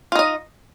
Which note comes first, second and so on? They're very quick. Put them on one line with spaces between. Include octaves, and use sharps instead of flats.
F4 D#4 D#5